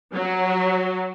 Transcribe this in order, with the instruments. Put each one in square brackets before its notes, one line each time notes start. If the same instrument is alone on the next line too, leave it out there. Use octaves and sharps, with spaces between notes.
[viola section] F#3